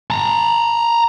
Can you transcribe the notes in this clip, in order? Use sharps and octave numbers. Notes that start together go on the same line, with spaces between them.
A5 A#5